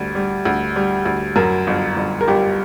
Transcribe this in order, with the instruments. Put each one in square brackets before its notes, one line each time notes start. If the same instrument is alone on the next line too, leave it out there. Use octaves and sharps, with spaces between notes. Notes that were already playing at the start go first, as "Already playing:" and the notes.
Already playing: [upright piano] D2 G3
G3
D2
G3
D2
F#2 A#4
G1
G1
A#4
G1 G4